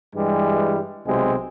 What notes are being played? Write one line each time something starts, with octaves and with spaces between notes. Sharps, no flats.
G2 E3 G3 G#3
B1 C3 G#3 C4